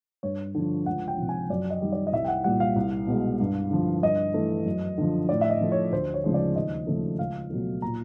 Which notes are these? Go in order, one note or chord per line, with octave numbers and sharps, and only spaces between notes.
G2 C#5
D3 F3
C#2 F#5
G5
C3 F3
G#5
F#2 D5
D#5
D#3 G3
D5
D#5
C2 E5
G5
F#5
A#2 G3 F#5
F5
C2
B2 G#3
G2
D3 F3
G2 D#5
E3 A3
F#2
D3 F3
A2 D5
E5
D#5
F3 A3
C#5
D2 C5
C#5
C#3 F3 G#3
D5
D#2 D#5
C#3 F3 A3
C#2 F5
B2 F#3 A3
A#2 A#5